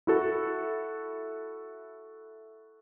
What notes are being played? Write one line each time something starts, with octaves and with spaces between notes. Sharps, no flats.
E4 F#4 A4